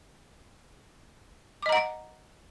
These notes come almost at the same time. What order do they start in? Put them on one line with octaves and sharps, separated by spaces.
D6 D#5 A#5 F#5